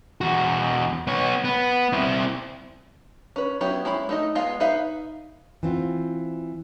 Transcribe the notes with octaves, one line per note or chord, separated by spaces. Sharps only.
E2 F#4
B3 C#5
B3
C4 E4
C#4 B4
F#3 B3 C#4 E4 G4
G#3 C#4 E4 B5
A3 D#4 D#5
G#3 B3 F4 D#5 F5
D#4 B4 E5 F5
E3 C4 F4